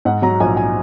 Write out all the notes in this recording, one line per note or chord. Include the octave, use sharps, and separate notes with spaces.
G#2 F#5
F#3 A#5
A#1 G#5
G#5